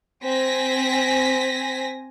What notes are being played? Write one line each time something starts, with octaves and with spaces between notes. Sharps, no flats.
C4 G#5 A#6 B6